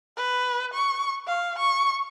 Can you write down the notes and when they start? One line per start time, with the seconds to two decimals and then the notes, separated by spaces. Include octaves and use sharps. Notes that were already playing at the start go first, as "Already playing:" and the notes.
0.17 B4
0.73 C#6
1.27 F5
1.59 C#6